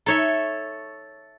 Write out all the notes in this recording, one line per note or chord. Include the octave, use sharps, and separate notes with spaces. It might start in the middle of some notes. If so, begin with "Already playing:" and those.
D#4 A4 C#5 E5 A#5